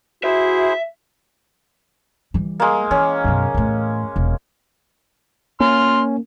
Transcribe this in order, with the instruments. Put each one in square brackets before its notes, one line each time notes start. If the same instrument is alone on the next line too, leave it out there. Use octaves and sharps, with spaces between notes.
[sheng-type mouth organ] E4 G#4 C5 [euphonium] F#4 [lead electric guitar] E5
[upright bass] E3 G3
[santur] G#3 A#3
[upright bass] E3 [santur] C#4
[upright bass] F#2 B2
E2 A2
E1
[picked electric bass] A#3 [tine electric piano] C#4 [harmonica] C6 F6